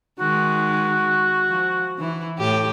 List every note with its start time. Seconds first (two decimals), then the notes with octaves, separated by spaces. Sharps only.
0.20 D#3 G#3 F#4
1.49 F3
1.98 E3 E4
2.38 A2 G4